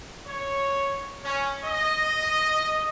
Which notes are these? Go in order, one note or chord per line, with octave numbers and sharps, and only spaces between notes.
C#5
C#4
D#5